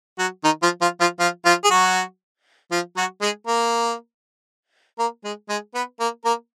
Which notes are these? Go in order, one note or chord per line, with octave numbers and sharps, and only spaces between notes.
F#3 F#4
D#3 D#4
F3 F4
F3 F4
F3 F4
F3 F4
F3 F4
G#4
F#3 F#4
F3 F4
F#3 F#4
G#3 G#4
A#3 A#4
A#3 A#4
G#3 G#4
G#3 G#4
B3 B4
A#3 A#4
A#3 A#4